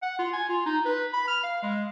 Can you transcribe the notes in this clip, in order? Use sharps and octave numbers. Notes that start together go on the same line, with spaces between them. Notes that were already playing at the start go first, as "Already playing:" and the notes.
F#5
F4
G#5
F4
D#4
B4
B5
F6
F5
G#3